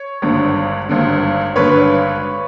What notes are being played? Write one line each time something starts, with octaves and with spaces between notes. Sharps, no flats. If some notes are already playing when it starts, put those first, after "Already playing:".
Already playing: C#5
G#1 G2 D3
G#1 G2 D3
G#1 G2 D3 B4 C#5